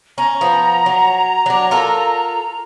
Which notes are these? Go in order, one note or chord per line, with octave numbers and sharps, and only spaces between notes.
C#4 A#5
F3 B3
F#3
F#3 D4
F4 A4 A#4